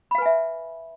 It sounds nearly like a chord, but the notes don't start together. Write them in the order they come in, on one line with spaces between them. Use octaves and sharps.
B5 F5 B4 G#5 E5